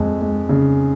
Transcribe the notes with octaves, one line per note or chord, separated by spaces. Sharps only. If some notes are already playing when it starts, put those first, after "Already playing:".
Already playing: F2 G#3
G#3
C#3